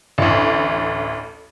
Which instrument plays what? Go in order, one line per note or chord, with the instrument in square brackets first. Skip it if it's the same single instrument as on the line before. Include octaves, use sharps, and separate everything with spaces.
[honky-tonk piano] A1 D2